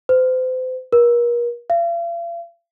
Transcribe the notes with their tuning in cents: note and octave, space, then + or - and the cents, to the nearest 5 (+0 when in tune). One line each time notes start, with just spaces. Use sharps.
C5 -35
A#4 +40
F5 -40